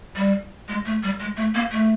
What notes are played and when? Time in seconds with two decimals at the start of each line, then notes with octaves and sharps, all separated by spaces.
0.16 G3
0.68 G#3
0.85 A3
1.03 G3
1.20 G#3
1.37 A3
1.55 A#3
1.71 A3